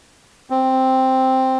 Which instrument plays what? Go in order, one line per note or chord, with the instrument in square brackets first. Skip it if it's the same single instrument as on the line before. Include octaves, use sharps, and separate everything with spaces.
[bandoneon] C4